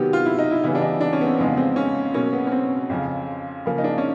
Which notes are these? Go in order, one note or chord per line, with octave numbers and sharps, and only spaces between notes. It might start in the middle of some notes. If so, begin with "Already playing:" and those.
Already playing: C3 D#3 F#3 B3 G4
F4
E4
D#4
E4
C#3 E3 G3 B3 E4
D4
D#4
D4
C#4
B3
C4
F2 C#3 F3 G#3 B3
C4
C#4
B2 F#3 A#3 C#4
B3
C#4
C4
F2 C#3 F3
C#3 F3 A#3
D#4
D4
C#4